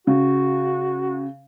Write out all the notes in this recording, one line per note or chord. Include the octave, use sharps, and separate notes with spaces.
C#3 F#4